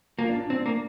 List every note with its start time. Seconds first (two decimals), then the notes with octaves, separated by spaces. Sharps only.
0.18 A#3 F4
0.29 D4
0.40 D4
0.50 C4
0.66 A#3